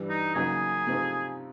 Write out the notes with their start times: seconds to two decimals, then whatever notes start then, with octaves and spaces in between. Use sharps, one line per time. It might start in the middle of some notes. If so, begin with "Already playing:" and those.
Already playing: G2 E3 G3
0.09 D#4
0.35 F#2 C#3 F#3 A#3 D#4 G#4
0.87 C3 F3 A3 C4 D#4